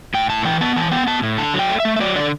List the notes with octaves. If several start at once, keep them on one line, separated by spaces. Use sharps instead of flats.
A2 G5
A2 A5
E3 G5
B3 A5
E3 A5
B3 G5
B3 A5
A2
D3 A5
F#3
G5
A3
E5
A3
E5
F#3 D5
D3 D5